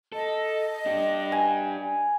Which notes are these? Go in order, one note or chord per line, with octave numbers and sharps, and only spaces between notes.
A4 D#5
D4 G4
G#5